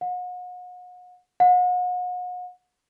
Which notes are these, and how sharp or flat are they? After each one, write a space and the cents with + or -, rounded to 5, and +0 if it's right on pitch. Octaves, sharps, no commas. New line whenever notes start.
F#5 -40
F#5 -40